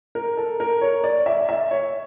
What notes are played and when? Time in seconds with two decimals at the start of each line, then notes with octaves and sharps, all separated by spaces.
0.15 A#4
0.37 A4
0.60 A#4
0.81 C#5
1.04 D5
1.26 E5
1.49 E5
1.71 C#5